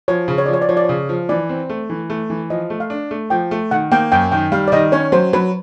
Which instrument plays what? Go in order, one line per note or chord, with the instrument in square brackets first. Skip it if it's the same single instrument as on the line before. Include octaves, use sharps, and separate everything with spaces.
[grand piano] F3 [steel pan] C#5
[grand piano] C#3
[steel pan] C#5
[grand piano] F3 [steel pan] D5
[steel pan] C#5
D5
[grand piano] F3 [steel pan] C#5
[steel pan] D5
[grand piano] C#3 [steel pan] C#5
[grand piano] F3
[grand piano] E3 [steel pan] D5
[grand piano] C4
A3
E3
A3
E3
[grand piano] F3 [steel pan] D#5
[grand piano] A3
[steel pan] F5
[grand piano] D4
A3
[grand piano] F3 [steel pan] G5
[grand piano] A3
[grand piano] D#3 [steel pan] F#5
[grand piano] A#3 [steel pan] G5
[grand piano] F#2 [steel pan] G5
[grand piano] D#3 [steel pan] G5
[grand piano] G3 [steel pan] F5
[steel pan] D5
[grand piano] D#3 [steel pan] D#5
[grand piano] C#4 [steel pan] C#5
[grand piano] F#3 [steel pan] C5
[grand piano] F#3 [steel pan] B4